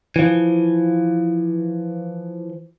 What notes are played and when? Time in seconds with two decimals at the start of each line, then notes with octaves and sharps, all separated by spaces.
0.16 E3 F3